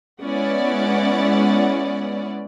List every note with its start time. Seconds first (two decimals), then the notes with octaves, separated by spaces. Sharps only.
0.22 G#3 B3 C#4 E4 D5 F#5